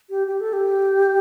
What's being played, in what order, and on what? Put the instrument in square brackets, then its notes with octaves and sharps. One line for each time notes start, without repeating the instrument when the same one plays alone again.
[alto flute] G4
G4
A4
G4